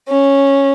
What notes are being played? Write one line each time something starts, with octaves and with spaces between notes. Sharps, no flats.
C#4